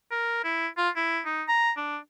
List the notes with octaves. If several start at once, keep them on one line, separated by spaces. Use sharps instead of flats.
A#4
E4
F4
E4
D#4
A#5
D4